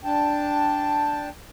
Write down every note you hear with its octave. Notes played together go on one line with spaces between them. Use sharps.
D4 G5 A5